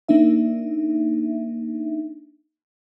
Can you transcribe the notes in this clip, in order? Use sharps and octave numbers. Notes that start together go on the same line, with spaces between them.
A#3 D4 D#4 E5